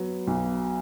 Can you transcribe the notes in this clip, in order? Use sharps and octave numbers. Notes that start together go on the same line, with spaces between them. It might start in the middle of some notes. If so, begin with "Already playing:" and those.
Already playing: F#3 B3
B1